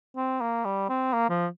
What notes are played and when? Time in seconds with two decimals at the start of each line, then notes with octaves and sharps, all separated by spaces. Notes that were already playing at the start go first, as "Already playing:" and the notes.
0.16 C4
0.41 A#3
0.65 G3
0.89 C4
1.13 A#3
1.29 F3